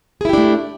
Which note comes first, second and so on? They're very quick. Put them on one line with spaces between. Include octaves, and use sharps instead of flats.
G#4 E4 G4 D4 A3